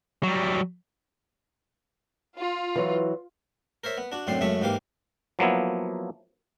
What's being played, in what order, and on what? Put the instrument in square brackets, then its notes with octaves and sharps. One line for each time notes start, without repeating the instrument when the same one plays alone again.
[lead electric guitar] F#3 G3
[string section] F4
[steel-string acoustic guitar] E3 F#3
[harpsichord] A#4 C5 C#5 E5
B3
D4 F#4
F#2 A2 D3 C4 C5 C6
F#2 C#3 G#3 A3 E5 C#6
G#2 E3 A#3 G4 F5 D6
[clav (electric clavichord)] F3 F#3 A#3 B3 E4